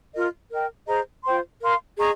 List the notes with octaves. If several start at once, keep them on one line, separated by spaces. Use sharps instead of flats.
F4 A#4 D#5
A#4 D#5 G5
G#4 C5 D#5 A#5
F4 C5 G5 C6
A#4 F5 C6
G#4 D#5 A#5 C#6